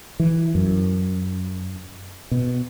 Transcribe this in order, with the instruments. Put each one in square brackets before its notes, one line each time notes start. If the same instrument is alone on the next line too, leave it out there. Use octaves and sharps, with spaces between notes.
[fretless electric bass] E3
F#2
B2